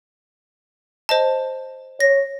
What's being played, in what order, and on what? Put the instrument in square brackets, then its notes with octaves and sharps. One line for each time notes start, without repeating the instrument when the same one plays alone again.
[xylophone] C5 D#5 A5
[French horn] C#5 [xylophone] A#6